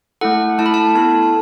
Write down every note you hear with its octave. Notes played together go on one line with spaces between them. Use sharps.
A3 E4 A4 F#5
A3 E4 A4 A5
B5
A5
B3 E4 A4 A5